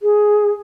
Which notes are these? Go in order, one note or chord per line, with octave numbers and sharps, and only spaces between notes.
G#4